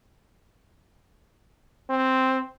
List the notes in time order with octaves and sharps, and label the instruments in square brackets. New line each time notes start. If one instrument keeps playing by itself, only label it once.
[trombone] C4